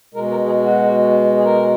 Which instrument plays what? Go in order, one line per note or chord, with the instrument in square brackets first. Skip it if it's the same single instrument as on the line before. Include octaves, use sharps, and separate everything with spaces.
[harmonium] B2 G#3 A#4
A#4
G#4
F#4
G#4
A#4